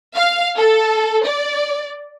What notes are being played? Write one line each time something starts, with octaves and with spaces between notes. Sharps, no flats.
F5
A4
D5